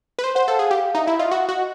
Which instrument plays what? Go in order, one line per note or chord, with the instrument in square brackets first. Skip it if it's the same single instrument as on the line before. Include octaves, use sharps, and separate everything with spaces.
[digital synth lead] B4
C5
[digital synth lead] C5 [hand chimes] F#5
[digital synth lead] A4 [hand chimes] F5
[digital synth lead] G#4 [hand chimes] F5
[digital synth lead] G4
[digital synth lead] D#4 [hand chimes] E5
[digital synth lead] E4 [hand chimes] E5
[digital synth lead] F4 [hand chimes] D#5
[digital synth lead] F#4
F#4